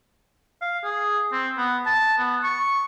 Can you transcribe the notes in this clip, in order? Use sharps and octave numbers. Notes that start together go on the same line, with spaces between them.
F5
G#4
C4
B3
A5
B3
C#6